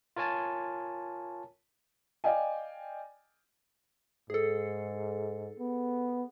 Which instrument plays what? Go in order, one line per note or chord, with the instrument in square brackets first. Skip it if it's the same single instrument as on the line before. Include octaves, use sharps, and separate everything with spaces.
[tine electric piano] F4 A#4 C#5 G#5 A5
[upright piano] D5 D#5 F5 G5 G#5
[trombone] G#2 [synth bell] G#4 A4
[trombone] B3